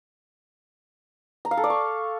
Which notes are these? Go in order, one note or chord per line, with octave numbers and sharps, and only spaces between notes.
A#5
F5
A4
D5
C#6